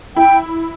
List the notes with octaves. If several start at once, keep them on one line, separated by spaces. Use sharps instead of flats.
E4 G5